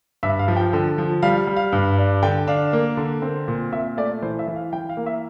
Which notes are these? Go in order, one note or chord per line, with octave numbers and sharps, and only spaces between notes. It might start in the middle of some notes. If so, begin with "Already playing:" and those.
G2 E5
F5
F3
G5
D3
F3
G3 F5
G3
F5
G2
D4
D3 G5
D4 F5
A#3
D3
C4
A#2
A#2 E5
A3 D5
E3 C5
E5
E3
F5
E3 G5
F5
A#3
E5